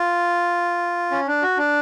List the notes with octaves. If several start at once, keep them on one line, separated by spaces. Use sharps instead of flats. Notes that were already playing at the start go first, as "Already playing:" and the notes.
Already playing: F4
C#4
D4
F#4
D4